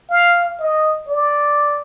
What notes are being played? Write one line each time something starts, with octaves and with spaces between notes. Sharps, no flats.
F5
D#5
D5